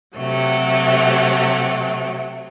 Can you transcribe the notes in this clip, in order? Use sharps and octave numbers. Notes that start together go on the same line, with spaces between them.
C3 F#3 A3